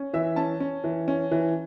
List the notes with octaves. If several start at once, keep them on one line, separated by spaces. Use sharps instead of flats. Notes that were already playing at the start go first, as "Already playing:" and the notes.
Already playing: C#4
E3 E5
C#4 A5
C#4
E3
C#4
E3